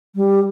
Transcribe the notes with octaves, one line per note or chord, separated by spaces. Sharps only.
G3